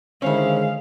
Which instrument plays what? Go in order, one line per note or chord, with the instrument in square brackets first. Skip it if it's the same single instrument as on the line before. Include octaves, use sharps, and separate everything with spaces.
[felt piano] D3 D#3 C5 [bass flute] G#3 [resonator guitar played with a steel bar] C#4 E4 [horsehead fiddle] F5